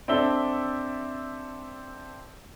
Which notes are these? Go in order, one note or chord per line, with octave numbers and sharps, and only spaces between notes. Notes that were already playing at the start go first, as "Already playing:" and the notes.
C4 D4 A4 E5 G7